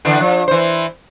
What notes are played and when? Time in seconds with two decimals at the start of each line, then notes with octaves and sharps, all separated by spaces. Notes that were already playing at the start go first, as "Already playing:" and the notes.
0.05 D3 E3 D4
0.20 F3
0.48 E3 C5